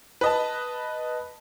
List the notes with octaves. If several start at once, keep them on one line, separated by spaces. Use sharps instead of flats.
B4 D#5 A5